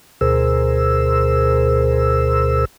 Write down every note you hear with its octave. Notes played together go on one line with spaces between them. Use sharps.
D2 B2 G#4 A#4 C5 E6